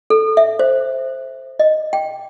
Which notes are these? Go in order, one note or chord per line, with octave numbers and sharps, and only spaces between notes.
A4
E5
C5
D#5
G5